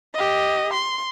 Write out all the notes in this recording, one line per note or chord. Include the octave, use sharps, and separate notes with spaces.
G4 D#5
C6